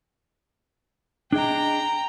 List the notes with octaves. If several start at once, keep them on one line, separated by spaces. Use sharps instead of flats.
D4 G#4 D#5 G5 A#5